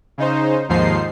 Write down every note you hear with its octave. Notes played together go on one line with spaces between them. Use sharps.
C#3 D#4 C5
D#2 G#2 F3 D#4 C5 C7